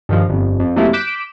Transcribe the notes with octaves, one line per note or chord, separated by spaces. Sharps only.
G2 D#3 F3
G1 F2
F2
F2 C3 F#3 A3 A#3 E4
D6 F#6 G6 B6 D7 E7